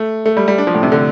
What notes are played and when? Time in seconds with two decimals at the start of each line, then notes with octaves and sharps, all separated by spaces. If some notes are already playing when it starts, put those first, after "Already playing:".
Already playing: A3
0.26 A3
0.37 G3
0.48 G3
0.58 D4
0.67 F3
0.75 A2
0.83 C3
0.92 D3